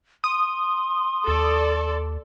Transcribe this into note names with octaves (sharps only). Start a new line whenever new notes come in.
C6 D#6
D#2 A4 D5